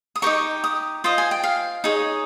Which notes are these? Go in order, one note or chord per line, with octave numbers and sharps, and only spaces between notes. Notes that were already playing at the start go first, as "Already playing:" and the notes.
D#6
D#4 G4 A#4 C#6
D#6
F4 C5 D#5
G#5
G5
F5
D#4 G#4 C#5